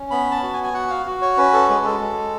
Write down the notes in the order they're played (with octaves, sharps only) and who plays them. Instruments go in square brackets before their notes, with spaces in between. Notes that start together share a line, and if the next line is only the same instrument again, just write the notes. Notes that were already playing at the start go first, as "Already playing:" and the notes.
Already playing: [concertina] C#4
B3 B5
A5
F#4
G#5
G#5
F#4 F#5
F5
F#4
C#5
C#4 B4
A4
G#3 B4
A4
G#3